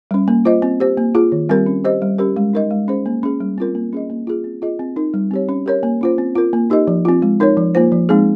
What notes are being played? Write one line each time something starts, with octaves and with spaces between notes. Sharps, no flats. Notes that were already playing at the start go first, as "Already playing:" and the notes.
G3 C#4
A#3
F4 C5 D#5
C4
G4 C5
A#3
F4 G#4
D#3
G3 C4 G4 A#4
C#4
G4 C5 D#5
G3
C#4 G4 A#4
G#3
D#4 A#4 D#5
G#3
C#4 G#4 C5
A#3
C#4 G#4
G3
C4 F4 A#4
A#3
C#4 G#4 D#5
A#3
F4 G#4
C4
F4 G#4 D#5
C4
D#4 A#4
G3
C4 G4 C#5
C#4
G4 A#4 C#5
A#3
C#4 F4 C5
C4
F4 A#4
A#3
D#4 G4 A#4 D#5
F3
C4 F4
G#3
D#4 A#4 C#5
F3
A#3 F4 C5
F3
G#3 C4 D#4 G#4